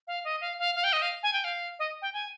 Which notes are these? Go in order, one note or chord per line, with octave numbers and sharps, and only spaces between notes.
F5
D#5
F5
F5
F5
G5
D#5
F5
G#5
G5
F5
D#5
G5
G#5